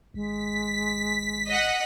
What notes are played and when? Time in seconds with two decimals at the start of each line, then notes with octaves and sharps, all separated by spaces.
0.14 G#1 G#3 B6
1.48 D#5 F#5